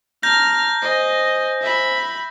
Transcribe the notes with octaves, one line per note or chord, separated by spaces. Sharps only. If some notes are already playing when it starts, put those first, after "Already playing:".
A5 A#5 F6 G6 A#6
C5 D#5 G#5
E5 B5